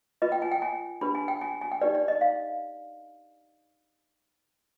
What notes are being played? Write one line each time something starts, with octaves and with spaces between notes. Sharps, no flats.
F4 B4 D#5
G5
G#5
G5
G#5
D4 G4 B4 B5
G#5
G5
G#5
G#5
G5
D#4 G4 B4 D5
D5
D#5
F5